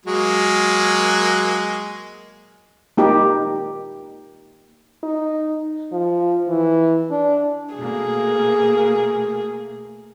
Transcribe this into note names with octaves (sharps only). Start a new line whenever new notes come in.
F#3 G#3 A#3
A#3 D#4 G4
D#4
F3
E3
D4
B2 A3 A#3 G#4